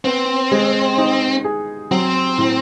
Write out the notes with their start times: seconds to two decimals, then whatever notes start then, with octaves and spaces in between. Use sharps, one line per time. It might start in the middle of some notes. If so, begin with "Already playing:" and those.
0.05 B3 C4
0.51 G#3
0.98 D#4
1.44 G#4
1.91 F#3 C4
2.38 A2